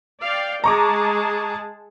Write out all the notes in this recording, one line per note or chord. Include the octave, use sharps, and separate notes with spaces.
D5 F5 G5
G#3 G#4 A5 A#5 C#6 D6